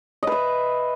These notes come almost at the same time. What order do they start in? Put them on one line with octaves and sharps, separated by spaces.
D#5 B4 E5